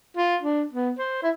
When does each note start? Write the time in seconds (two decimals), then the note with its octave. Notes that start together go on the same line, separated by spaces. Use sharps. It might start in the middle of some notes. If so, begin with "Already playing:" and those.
0.17 F4
0.42 D4
0.73 B3
0.98 C5
1.23 E4